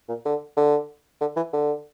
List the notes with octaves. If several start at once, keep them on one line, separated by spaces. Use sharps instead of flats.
A#2
D3
D3
D3
E3
D3